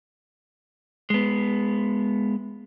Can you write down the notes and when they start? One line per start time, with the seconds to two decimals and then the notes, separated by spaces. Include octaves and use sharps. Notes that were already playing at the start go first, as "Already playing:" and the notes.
1.10 G#3 B3